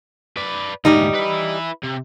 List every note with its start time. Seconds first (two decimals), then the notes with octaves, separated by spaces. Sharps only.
0.37 B4 D5
0.85 D2 G#2 G3 D#4
1.15 E4 B4
1.83 C3